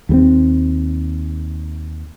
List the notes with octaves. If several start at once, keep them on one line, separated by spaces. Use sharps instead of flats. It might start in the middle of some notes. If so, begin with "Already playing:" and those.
D#2 G3 C4